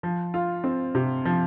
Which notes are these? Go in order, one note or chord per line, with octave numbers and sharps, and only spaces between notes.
F3
F4
C4
C3
F3